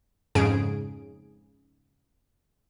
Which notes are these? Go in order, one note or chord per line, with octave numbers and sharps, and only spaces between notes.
F2 G#2 C#3 G#4 D7